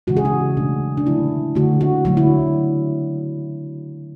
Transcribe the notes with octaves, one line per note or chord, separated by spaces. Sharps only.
C#3 E3 G#3 F#4
G#4
F#4
B2 F#3 A3 D4
D4
D3 F#3 A3 E4
D3 A3 F#4
F#4
D3 F#3 A3 F#4
E4